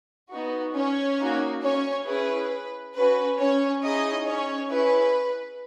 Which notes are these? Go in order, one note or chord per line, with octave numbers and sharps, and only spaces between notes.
B3 D#4 F#4
C#4 C#5
A#3 D#4 F#4
C#4 C#5
C#4 E4 G#4 B4
C#4 F#4 B4
C#4 C#5
C#4 D#4 E4 G#4 D#5
C#4 C#5
C#4 E4 G#4 B4